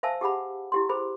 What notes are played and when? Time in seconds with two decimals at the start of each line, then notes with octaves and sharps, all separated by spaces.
0.03 C5 E5 F5 G#5 A5 E6
0.21 G4 G#4 F#5 B5
0.72 E4 G4 C6
0.89 G#4 C5 B5